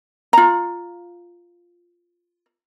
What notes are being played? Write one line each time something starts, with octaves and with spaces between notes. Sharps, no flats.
F4 A#5